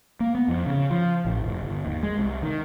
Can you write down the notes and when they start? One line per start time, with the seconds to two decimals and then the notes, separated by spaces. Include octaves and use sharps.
0.20 A#3
0.35 B3
0.48 F2
0.66 C#3
0.91 F3
1.25 A1
1.44 F1
1.63 G1
1.85 D#2
2.03 G#3
2.18 C2
2.42 D#3